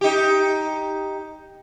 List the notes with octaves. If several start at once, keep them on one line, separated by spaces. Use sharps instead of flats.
D#4 G4